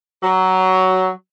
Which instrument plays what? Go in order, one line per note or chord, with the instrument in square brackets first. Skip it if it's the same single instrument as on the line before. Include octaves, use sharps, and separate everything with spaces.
[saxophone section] F#3